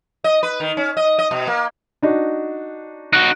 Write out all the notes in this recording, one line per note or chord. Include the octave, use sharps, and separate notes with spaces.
D#5
B4
D#3
C#4
D#5
D#5
B2
A#3
D4 D#4 F#4
D#4 F#4 F#6 D7